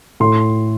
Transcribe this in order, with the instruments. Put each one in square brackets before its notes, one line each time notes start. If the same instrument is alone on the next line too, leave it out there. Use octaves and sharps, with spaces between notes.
[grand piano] A2 C6